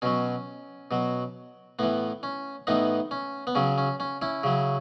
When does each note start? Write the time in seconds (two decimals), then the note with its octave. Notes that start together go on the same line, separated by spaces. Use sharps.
0.02 B2 F#3 C#4
0.91 B2 F#3
1.79 A2 E3 B3
2.23 C#4
2.67 A2 E3 B3 D#4
3.11 C#4
3.47 B3
3.55 C#3 F#3 C#4
3.78 C#4
4.00 C#4
4.22 C#4 E4
4.43 C#3 F#3